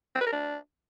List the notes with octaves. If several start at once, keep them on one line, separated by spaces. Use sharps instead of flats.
C4
B4
A#4
D4